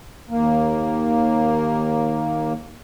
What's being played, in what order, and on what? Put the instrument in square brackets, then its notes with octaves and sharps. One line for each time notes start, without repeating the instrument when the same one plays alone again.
[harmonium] D#2 A#3